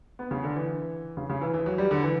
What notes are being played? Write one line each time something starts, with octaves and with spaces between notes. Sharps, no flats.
B3
C#3
D3
E3
C#3
C#3
E3
E3
F#3
G3
D3
E3